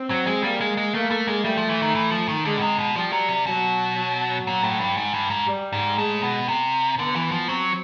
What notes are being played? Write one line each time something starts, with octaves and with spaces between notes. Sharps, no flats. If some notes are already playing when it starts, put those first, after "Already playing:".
Already playing: C4
F#3
G#3
G3 A#3
G#3
G#3
A3 A#3
A3
G#3
G3 A3
F3
E3
D#3
E3
F3
D#3
D3 G#3
B2
C3
B2
F3 G3
F#3
C3
B2 F#3
F#3
A#2
A2
G2
G#2
G2
G#2
G3
G#2
A2 G#3
B2
C3
D3 B3
E3
F3
F#3 C4